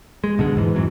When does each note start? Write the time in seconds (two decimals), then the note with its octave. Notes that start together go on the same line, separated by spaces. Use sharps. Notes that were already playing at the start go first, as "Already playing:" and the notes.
0.24 G#3
0.38 B1 B2 D3 G#3
0.55 E2 G#2 E3
0.76 G#2 C3 E3 F#3